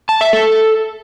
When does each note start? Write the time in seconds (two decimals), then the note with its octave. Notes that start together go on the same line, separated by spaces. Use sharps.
0.09 A5
0.21 E5
0.33 A4